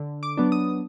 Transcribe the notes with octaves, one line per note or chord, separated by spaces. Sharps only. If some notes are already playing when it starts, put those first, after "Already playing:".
Already playing: D3
D6
F#3 B3 D4
D#6